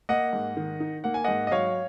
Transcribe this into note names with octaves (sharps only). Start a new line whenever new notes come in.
A#3 D#5 F#5
G#2
D#3
D#4
A#3 F#5
G#5
G#2 D#5 F#5
D#5
F#3 C#5 F5